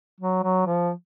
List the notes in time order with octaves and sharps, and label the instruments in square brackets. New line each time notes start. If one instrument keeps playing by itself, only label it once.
[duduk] F#3
F#3
F3